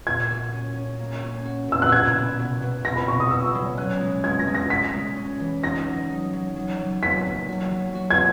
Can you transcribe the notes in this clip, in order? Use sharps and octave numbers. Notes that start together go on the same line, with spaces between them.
A#2 G#6
F#4
C#4
C#4
A#3
C#4
F#4
A#2 E6
F#6
B2 G#6
E4
B2
B2
E4 A#6
B5
B2 C#6
D#6
E4 E6
F#3
C#4 F#6
G#3
G#3 G#6
A#6
G#3
A#6
G#3 B6
G#3
C#4
E3
D#4 A#6
F#3
D#4
F#3
F#3
F#3
A#3 B6
F#3
F#4
F#3
F#4
G#6